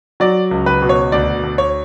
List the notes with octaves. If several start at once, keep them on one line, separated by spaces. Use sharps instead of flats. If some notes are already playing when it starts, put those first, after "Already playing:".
F#3 D5
C#2
B4
B2
C#5
D2 D5
D2
C#5